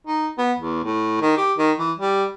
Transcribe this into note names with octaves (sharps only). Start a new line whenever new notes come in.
D#4
B3
E2
A2
D#3
G4
D#3
E3
G3